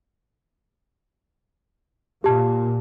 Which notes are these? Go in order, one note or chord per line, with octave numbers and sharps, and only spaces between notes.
A#2 G4 A5